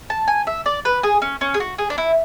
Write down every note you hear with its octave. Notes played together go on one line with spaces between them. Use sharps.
A5
G#5
E5
D5
B4
G#4
C#4
C#4
G#4
F#4
G#4
D4
E4